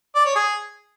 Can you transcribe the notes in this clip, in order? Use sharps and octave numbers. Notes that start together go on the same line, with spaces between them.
D5
C#5
G#4